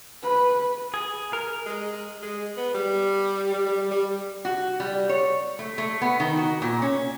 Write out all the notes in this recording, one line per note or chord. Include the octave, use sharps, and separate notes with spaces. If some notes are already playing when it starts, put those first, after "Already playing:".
B4
G#4
A#4
G#3
G#3
B3
G3
G3
G3
G3
F#4
G3
C#5
A3
A3
B3
D#3
F#4
A#2
C#4